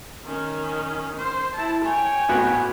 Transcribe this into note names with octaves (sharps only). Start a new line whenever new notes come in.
D#3 C#4
C5
E4 A5
C#5 G5 G#5
A1 B3 F#4